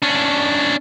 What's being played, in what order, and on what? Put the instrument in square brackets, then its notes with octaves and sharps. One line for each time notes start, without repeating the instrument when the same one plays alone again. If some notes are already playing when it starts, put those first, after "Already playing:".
[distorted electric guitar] C#4 D4